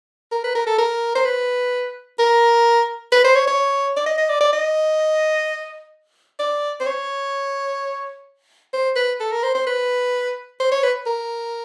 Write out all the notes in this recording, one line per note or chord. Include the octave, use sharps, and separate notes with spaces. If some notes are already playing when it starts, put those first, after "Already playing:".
A#4
B4
A#4
A4
A#4
C5
B4
A#4
B4
C5
C#5
C#5
D5
D#5
D#5
D5
D5
D#5
D5
C5
C#5
C5
B4
A4
A#4
C5
C5
B4
C5
C#5
B4
A#4